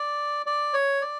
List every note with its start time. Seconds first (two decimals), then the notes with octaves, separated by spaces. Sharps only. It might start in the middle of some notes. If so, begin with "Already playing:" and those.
Already playing: D5
0.46 D5
0.74 C#5
1.01 D5